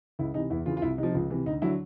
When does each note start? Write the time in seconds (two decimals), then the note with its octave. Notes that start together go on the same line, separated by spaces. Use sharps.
0.19 C#2 E4
0.34 C3 E3 D#4
0.50 E2 E4
0.66 C#3 E3 F4
0.77 F4
0.82 C2 E4
0.98 C3 F3 D#4
1.15 C#2
1.30 C3 E3
1.46 D2 D#4
1.62 D3 F#3 E4